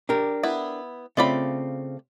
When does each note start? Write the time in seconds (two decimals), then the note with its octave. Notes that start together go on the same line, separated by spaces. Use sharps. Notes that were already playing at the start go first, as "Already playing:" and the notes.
0.09 D4 G4 A#4
0.43 B3 E4
1.17 C#3 A3 C4 F4 D5 B5